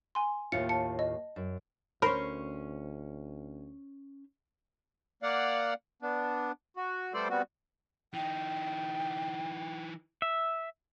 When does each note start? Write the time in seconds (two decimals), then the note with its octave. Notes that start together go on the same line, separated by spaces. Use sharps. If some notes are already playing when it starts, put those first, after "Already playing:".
0.15 G#5 C6
0.52 D#2 A2 F4 C#7
0.69 A5 C#7
0.99 D#5
1.36 F#2
2.02 D2 C#4 A#4 C5 B5
5.23 A#3 D5 F5 F#5
6.02 B3 D4
6.77 F#4
7.13 G3 A3 B3 A4 C5 D5
7.30 G3 B3 C4 F#4
8.14 E3 D#4 G5
10.22 E5